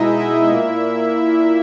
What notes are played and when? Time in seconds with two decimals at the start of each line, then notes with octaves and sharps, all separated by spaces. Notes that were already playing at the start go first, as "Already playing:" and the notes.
Already playing: B2 G#3 D#4 E4 D#5 E5
0.18 E4 E5
0.50 A#2 A#3